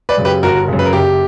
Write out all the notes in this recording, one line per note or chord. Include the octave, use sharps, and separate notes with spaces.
B4 D5
F#2 C#3
G4 B4
G1 F#4 A#4
F#2 C#3
B4
A#4
F#1 G4